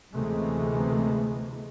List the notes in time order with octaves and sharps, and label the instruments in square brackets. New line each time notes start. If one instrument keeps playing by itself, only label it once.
[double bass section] D2 C3 E3 G#3 A3 B3